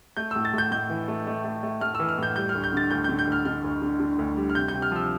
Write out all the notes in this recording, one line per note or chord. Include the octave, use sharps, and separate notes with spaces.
A3 G6
E6
A2
A6
A2 G6
A2 G6
E3
A3
A3
A3
A3
A3 F6
E6
E3
F6
A2 G6
G3 G6
F6
D2
G6
D3 A6
D2 G6
G6
D3
G6
D2 F6
D3 F6
D2
D3
D3
D2
G3
F6
C3 G6
G6
C3
F6
F3 E6